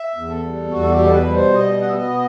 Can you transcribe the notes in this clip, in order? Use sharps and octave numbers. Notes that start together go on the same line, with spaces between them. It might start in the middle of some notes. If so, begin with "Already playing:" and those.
Already playing: E5
E2
A4
G3
E2 F#4
A4
G4
B2
A4
B4
G3
C5
B2 D#5
B3 F#5
E5
D#5
B2